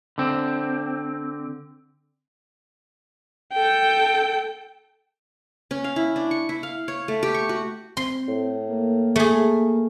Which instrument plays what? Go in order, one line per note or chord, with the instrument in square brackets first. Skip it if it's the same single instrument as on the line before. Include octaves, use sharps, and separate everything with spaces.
[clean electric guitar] D3 C4
[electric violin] A4 G5
[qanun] C#4
F5
E4
D4
C#6
E4
F5
C#5
A3
G4
C#6
F#4
[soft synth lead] C4 [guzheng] C6
[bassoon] A2
[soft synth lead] A#3
[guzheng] A3 G#4